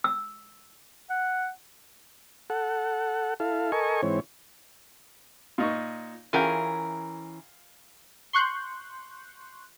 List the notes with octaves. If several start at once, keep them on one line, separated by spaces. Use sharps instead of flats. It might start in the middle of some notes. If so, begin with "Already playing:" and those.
E6
F#5
A4 F#5
E4 A4 F5
A4 A#4 D#5 G#5 C#6
G#2 E3 C4 C#5
A#2 D#4 C#6
E3 C#4 F4 G#4 A#4 G5
C6 C#6 F#6 G6